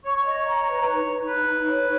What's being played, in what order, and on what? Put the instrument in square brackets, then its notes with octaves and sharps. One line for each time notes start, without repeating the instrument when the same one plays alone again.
[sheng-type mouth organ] C#5 [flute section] C#6
[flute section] D#5
A#5
B4
D#4
D#4
[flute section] D#4 [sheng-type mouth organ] B4
[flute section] D#4
C#5